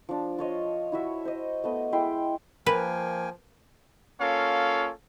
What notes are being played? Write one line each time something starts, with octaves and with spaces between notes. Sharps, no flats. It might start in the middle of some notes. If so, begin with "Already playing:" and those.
F3 D4
F4 C#5 D#5
E4 F#4 E5
C5 D#5
A3 B3 D#5
G#3 E4 G5 C6
F3 A#3 A#4 B4 G5 G#5
A#3 C#4 F4 A4 C#5 F5